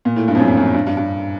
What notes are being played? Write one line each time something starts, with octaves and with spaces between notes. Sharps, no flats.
A#2
A2
G2
F2
F#2
F2
F#2
G2
G2
G2